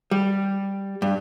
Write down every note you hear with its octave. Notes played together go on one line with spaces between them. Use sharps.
G3
G2